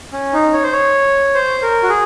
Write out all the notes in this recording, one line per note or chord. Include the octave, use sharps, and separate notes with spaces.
C#4
D#4
C#5
C5
C#5
C5
A#4
F#4
G#4